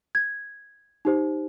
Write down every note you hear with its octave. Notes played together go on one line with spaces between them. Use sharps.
G#6
D#4 G4 C5